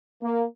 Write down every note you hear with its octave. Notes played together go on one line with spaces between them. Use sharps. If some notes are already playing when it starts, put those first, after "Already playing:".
A#3